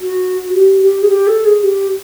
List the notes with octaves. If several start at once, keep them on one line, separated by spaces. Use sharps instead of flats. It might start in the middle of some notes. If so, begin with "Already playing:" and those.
F#4
G4
G4
G#4
G4
A4
G#4
G4